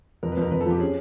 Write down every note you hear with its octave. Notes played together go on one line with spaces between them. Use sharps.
F2 A#4
B4
F2 A#4
F2 B4
A4
F3 G4
C#4 G#4